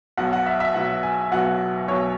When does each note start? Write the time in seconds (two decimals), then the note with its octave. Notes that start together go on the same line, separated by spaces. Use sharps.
0.17 B1 B2 F#3 F#5
0.33 F#5
0.46 E5
0.60 E5
0.74 B1 B2 F#3 F#5
1.03 G#5
1.32 B1 B2 F#3 F#5
1.88 B1 B2 F#3 C#5